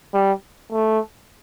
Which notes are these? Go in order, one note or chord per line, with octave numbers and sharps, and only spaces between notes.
G3
A3